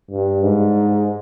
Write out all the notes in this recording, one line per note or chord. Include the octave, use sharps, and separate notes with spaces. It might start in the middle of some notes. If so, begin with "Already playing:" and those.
G2
G#2